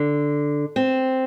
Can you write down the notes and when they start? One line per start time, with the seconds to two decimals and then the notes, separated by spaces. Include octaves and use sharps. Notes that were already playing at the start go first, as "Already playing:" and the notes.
Already playing: D3
0.76 C4